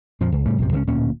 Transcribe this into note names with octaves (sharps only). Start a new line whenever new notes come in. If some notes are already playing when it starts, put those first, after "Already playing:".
F2 A#2 F3
C#2
A2 C#3 G3
A#1 F#2 C3
C#2 A3 C#4
D1 D2 A#2 C#4